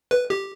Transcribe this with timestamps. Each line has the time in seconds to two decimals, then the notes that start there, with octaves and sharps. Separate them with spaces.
0.11 B4
0.30 G4